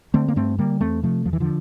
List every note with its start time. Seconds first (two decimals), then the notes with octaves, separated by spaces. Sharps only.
0.14 D3 A3 C4
0.28 A#3
0.36 G2 A3 C4
0.59 D3 G3 A#3
0.81 E2 A3 C4
1.03 C3 F3 A3
1.25 E2 F3
1.33 E3
1.40 D3 F3